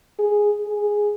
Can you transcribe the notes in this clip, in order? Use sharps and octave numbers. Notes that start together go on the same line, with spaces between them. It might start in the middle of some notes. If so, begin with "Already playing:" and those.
G#4
G#4